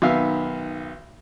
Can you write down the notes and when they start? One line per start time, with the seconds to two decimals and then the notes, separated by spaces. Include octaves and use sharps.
0.02 B1 D#3 B3 E5 F5 F6